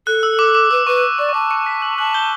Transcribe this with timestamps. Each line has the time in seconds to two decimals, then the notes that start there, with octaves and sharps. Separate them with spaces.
0.07 A4 F#6
0.23 E6
0.39 D6
0.55 D6
0.71 B4 E6
0.87 B4 C#6
1.03 D6
1.18 D5 C#6
1.29 C#6
1.34 A5 D6
1.51 C#6 C#7
1.66 B6
1.82 F#6 F#7
1.98 A5 F#6 F#7
2.14 G6 G7